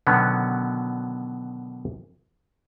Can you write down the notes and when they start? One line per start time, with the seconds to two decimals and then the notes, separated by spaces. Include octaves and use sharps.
0.07 B2 D3 D#3 F#3 B3 C#4